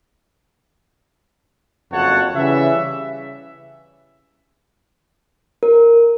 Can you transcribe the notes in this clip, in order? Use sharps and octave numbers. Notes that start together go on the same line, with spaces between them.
F#1 F2 F#4 C#5 F#5 A5
C#3 E3 G3 E5
A#4